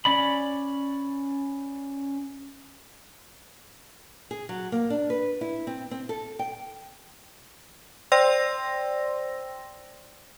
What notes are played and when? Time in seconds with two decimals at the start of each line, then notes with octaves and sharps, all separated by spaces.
0.05 C#4 D5 B5
4.31 G#4
4.49 F#3
4.72 A#3
4.90 D4
5.10 B4
5.41 E4
5.67 C4
5.91 C4
6.09 A4
6.39 G5
8.12 C5 D5 G5 C6 E6 A#6